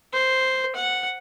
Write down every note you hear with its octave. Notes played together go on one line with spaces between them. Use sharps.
C5
F#5